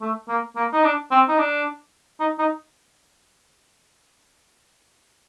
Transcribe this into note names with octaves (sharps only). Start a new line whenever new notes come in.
A3
A#3
A#3
D#4
D4
C4
D#4
D4
D#4
D#4